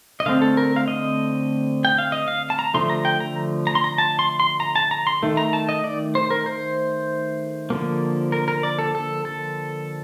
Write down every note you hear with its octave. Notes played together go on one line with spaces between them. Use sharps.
D#5
D3 A3 C4 F5
A4
A#4
F5
D#5
G5
F5
D#5
F5
A5
A#5
D3 F3 A3 C6
A#5
G5
A#5
A#5
C6
A#5
A5
C6
C6
A#5
A5
A#5
C6
D#3 A3
A#5
A5
D#5
D5
C5
A#4
C5
D3 F3 A#3
A#4
A#4
D5
A4
A4
A4